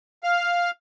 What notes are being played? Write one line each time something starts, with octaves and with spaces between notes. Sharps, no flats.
F5 F6